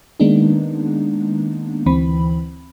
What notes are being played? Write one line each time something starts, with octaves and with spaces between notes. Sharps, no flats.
D#3 G#3 A#3 B3 D4 D#4
D2 E3 C4 B5